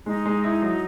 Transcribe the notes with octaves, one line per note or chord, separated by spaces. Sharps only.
G#3 D#4
G#3
E4
F#3